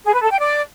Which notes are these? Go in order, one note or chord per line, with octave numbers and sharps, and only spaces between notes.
G#4
B4
A4
G5
D5